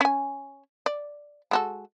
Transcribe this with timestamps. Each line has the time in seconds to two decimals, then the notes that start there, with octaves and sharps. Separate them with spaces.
0.01 C#4 G#5
0.86 D5
1.51 G#3 F#4 A4